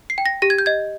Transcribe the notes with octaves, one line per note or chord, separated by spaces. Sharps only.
C7
G5
A#6
G4 A#6
G#6
G6
D#5 G#6